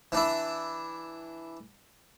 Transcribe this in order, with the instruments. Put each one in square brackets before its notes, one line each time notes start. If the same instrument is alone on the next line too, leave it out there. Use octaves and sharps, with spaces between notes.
[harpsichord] E3 D4 E4